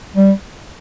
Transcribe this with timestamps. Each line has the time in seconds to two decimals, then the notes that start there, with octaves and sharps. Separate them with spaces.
0.16 G3